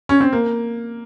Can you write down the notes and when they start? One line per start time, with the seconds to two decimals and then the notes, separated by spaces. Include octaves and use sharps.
0.09 C#4
0.20 C4
0.33 A#3